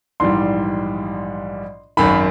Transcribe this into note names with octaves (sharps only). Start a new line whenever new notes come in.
A#1 G#2 E3 G3 C6
G#1 F#2 D#3 B5